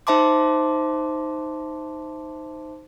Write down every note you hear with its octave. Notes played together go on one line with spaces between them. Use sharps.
D#4 C5 E5 A5 C6 D6